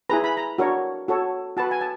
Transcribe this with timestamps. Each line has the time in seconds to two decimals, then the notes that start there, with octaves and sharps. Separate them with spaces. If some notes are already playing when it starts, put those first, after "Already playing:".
0.10 E4 G#4 B4 A#5
0.24 B5
0.37 A#5
0.58 D4 F#4 A#4 C#5
1.08 F#4 A4 C#5
1.57 F#4 B4 A5
1.71 G#5
1.81 A5